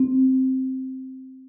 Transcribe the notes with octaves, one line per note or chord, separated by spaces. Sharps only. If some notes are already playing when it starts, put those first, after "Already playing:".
Already playing: C4